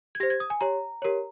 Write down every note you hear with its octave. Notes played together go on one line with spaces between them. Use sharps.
G#6
G4 C5 A#6
G#6
D#6
G#5
G4 C#5 A#5
G4 A#4 C#5